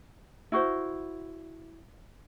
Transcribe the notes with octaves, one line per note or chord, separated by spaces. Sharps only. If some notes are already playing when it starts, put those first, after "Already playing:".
E4 F#4 C5